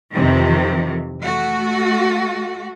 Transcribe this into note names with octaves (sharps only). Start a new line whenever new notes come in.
F2 C3 D#3 E3
A3 F#4